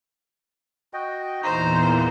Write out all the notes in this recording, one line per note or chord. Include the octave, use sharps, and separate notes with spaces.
F#4 D#5 G5
E2 A#2 E3 D#4 C5 A#5